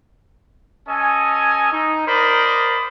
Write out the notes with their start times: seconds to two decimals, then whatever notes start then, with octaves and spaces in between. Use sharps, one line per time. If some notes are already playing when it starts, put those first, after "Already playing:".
0.88 C#4 A4 D#5 G#5
1.72 D#4
2.08 A#4 C5 D5 D#5 B5